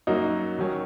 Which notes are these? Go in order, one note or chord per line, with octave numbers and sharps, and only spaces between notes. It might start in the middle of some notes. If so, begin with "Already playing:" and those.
F#2 F#3 A#3 D#4 F#4
D#3 F#3 C#4